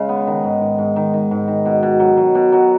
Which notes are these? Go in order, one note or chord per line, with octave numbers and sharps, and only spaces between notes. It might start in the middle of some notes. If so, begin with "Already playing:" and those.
Already playing: C#3 G#3
B3
D#3
G#2
G#2
G#2
D#3
D#3
G#2
D#3
B2
B2
F#3
F#3
B2
F#3